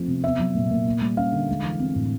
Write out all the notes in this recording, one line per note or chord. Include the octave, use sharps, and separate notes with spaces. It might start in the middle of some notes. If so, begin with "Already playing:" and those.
Already playing: F3 A3 C4
C3
B3 E5
F#3
A#2
A#2
A#3
G3
C#4 F5
D3
G#3
E3
C4
A2